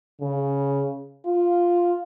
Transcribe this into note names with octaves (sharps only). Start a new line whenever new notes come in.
C#3
F4